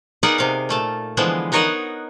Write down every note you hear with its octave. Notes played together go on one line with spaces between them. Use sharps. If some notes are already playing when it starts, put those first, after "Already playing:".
B3 D#4 G#4 A#4 D5 F#5
C3 F5
A#2 A3 A5
D3 E3 F3 G#3 B3 C5
B3 D#4 A#4 C#5 D#5 F#5